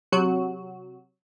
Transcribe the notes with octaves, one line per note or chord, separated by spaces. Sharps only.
C3 F#3 F#4